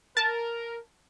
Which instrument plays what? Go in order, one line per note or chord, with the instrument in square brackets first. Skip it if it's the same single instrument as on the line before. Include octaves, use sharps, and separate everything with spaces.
[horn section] A#4 [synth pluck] A5